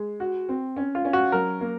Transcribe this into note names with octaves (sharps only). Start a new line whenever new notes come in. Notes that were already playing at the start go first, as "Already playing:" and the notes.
Already playing: G#3
F#4
C4
C#4
F4
C#4
F#4
F#3 A#4
A#3